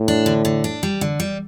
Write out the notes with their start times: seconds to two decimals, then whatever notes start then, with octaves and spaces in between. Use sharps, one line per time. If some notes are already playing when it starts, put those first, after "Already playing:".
Already playing: A2
0.08 D4
0.26 D3
0.45 D3
0.64 D4
0.83 G3
1.01 D3
1.20 G3